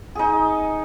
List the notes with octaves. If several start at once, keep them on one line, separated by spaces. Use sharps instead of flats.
D#4 G#4